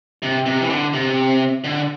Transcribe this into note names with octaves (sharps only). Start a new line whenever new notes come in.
C3
C3
E3
D3
C3
D3